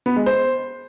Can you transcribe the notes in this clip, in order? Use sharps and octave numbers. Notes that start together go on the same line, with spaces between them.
B3
G#3
C5